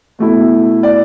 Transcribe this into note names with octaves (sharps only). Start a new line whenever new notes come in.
B2 A3 E4
D5